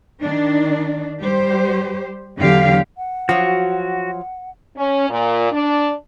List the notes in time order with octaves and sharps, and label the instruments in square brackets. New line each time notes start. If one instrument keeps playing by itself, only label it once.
[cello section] D#3 D4
G3 G4 C5
E2 D3 F#3 G4 F5
[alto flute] F#5
[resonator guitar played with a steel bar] F3 F#3 [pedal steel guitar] F#4
[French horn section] C#4
A#2
D4